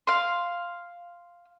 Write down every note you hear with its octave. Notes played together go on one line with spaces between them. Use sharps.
F5 C6